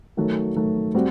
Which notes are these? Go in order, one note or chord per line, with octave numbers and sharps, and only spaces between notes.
D#3 F#3 A3
D#3 F#3 A3
G3 C4 F#4